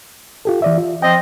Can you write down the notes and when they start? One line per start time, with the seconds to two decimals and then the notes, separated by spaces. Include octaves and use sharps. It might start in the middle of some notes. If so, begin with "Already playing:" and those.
0.45 F4 G4 A4
0.62 E3 D5 E5
0.78 F4
1.02 F3 C4 D#5 G5